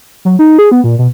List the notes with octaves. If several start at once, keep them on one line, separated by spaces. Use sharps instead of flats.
F#3
D#4
G#4
B3
A#2
B2